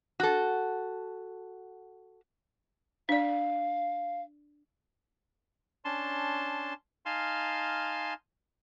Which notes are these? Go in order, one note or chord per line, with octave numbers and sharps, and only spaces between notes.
F#4 A4
D4 D5 F5
C#4 D4 A5 C6
D#4 F5 G#5 A5 C6 F6